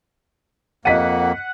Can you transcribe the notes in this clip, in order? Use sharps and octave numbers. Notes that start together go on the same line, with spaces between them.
F2 A#3 D#5 F#5 B6 D#7